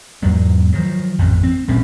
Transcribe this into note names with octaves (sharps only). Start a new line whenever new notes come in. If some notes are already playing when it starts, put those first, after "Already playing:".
E2 G#2 F#3 G#3
D#3 F3 F#3
A1 F2 G#2
C4
A1 A#2 C4 C#4